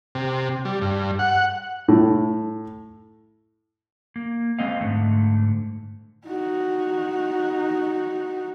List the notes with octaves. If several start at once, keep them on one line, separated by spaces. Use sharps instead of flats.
C3
G3
G2
F#5
A2
A#3
G#3 C4 D#5 F5
G#2 D3 E3 A3
D#4 F#4